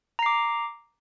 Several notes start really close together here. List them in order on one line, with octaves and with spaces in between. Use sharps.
A#5 C7 D6